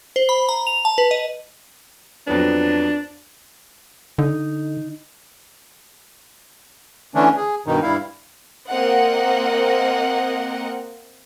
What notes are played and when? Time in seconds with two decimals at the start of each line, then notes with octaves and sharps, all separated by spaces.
0.16 C5
0.29 B5
0.49 A#5
0.67 F7
0.85 A5
0.98 B4
1.11 D#5
2.27 F2 F#3 B3 D4
4.18 D3 D#4
7.15 D3 E3 A3 C#4 D4
7.36 G#4
7.66 G2 B2 D#3 D#4
7.82 G2 G3 E4 F5
8.68 A#3 C4 A#4 D#5 F#5